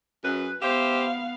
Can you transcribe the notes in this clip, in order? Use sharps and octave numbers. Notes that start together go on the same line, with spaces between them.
F#2 G#4 B4
B3 G4 C5 E5 F5